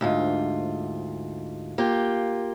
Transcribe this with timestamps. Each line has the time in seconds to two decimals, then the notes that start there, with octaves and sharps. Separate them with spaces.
0.01 D2 G#2 F4
1.78 A#3 F4 G4